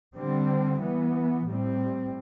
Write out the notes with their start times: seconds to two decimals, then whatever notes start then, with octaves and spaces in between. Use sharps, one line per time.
0.15 D3 G3 C4
0.81 E3 B3
1.46 A2 G3 C4